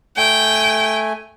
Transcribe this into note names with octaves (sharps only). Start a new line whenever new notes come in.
A3 G5 G#5